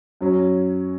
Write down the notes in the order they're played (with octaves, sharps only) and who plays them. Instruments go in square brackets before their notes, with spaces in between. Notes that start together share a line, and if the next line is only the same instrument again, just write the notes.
[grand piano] F#2 F#3 C#4